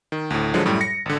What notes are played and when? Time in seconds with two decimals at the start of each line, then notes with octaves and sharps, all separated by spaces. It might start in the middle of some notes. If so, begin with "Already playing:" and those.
0.12 D#3
0.30 D2 A2
0.54 D3 F3 F#3 G#3
0.66 F#2 A2 G3
0.81 A#6 C#7
1.06 G#1 D3